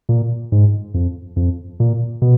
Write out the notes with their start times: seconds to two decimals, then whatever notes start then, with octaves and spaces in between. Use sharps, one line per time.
0.09 A#2
0.52 G#2
0.94 F2
1.36 F2
1.80 A#2
2.22 B2